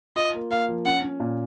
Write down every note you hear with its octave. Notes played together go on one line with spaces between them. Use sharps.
F4 D#5
A#3
A#3 F5
F3
C#4 F#5
C#4
A#2